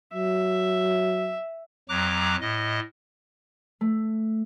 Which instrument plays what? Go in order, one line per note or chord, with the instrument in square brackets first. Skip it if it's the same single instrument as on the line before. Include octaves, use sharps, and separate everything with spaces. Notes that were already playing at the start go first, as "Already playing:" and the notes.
[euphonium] F#3 [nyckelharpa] E5
[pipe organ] F2 F#3 A#5 D6 F#6
A2 D#5
[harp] A3